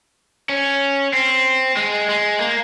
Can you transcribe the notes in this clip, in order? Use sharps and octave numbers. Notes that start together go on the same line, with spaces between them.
C#4
C4
G#3
G#3
A#3